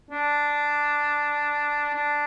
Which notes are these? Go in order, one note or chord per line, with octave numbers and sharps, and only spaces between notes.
D4
D4